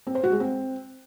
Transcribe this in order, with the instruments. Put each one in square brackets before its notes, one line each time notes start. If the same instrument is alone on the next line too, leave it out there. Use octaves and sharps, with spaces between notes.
[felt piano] C4
C5
F#4
G#3
C4